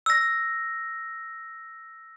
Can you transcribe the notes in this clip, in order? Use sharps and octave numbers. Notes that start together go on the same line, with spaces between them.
E6 A#6